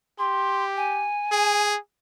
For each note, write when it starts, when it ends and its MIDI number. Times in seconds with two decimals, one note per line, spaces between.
0.19 1.10 67
0.19 0.64 84
0.76 1.67 80
1.31 1.77 68